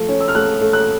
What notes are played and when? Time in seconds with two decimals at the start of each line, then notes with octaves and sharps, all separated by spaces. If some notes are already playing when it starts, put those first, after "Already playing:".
Already playing: F3 A3
0.09 C#4
0.21 E6
0.28 F6
0.35 A3 F#6
0.61 A3
0.73 F#6